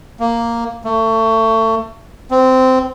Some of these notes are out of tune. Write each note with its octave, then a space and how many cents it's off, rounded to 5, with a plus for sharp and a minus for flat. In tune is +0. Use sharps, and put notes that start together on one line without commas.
A#3 -5
A3 +30
C4 -15